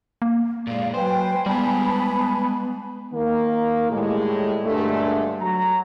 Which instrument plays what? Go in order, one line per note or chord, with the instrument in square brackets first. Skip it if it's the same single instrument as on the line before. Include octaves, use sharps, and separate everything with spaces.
[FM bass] A#3
[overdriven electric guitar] A#2 G#3 [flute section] D5 F5
[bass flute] F#3 [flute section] B4 G5 G#5 [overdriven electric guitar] C5
[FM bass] G3 [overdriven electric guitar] G#3 F#5 [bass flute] B3 [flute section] G#5 A5 B5
[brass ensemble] D#3 A#3
A2 G3 G#3
G2 A#2 D3 G#3 A3
F#3 A#5